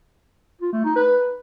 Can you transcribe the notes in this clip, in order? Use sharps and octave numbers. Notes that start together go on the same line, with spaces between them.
F4
A3
D#4
B4